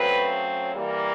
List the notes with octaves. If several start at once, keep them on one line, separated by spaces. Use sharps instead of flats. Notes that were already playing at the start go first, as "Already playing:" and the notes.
Already playing: C#3 F#3 A3 C4 B4
E3 G3 A#3